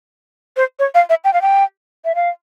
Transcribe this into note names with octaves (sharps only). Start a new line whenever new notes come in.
C5
C#5
F5
E5
G5
F5
G5
E5
F5